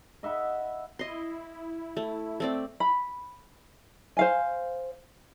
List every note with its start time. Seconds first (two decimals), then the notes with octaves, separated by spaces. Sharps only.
0.23 D#5 E5 F#5 B5
0.99 E4 D#5 C6
1.97 A3
2.40 A3 C4 D5
2.80 B5
4.17 C5 F5 G#5